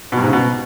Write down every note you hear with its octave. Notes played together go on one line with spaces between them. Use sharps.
B2
G2
G#2
C#3
B2